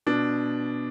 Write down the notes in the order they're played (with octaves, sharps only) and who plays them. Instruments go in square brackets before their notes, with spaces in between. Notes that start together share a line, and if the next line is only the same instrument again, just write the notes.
[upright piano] B2 D4